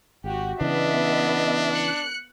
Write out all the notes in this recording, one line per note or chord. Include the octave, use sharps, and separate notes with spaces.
G#1 F#4 G4
C#3 E3 B3 D4 D#5 E5
F#6 C#7